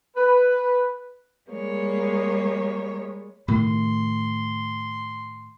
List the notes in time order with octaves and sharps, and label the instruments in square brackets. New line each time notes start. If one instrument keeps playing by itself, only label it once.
[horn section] B4
[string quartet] G3 G#3 A#3 C#5
[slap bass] A2 C3 D#3 [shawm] C6